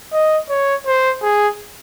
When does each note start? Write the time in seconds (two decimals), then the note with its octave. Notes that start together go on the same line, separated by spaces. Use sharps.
0.12 D#5
0.49 C#5
0.87 C5
1.22 G#4